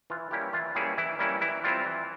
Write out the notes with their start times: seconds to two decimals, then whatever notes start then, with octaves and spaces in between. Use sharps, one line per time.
0.10 E3 F4
0.31 G3 A#3 C#4 E4 G4
0.53 E3 F4
0.75 G3 A#3 C#4 E4 G#4
0.98 E3 E4
1.19 G3 A#3 C#4 E4
1.41 E3 E4
1.64 G3 C4 E4 F4
1.85 E3